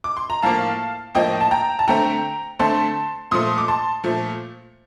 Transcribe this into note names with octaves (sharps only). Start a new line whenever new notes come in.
D6
C6
A#5
A2 F3 A#3 F5 A5
A2 F3 A#3 D#5 G5
A5
G5 A#5
A5
D3 A3 C4 G5 A#5
D3 A3 C4 A5 C6
A#2 F3 A3 C6 D#6
D6
A5 C6
A#2 F3 A3